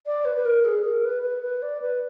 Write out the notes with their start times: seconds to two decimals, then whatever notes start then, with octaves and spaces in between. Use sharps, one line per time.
0.06 D5
0.25 B4
0.37 B4
0.45 A#4
0.65 G#4
0.85 A#4
1.04 B4
1.23 B4
1.43 B4
1.62 D5
1.82 B4